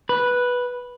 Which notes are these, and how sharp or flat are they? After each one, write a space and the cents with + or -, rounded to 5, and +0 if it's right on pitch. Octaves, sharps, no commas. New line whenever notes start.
B4 -5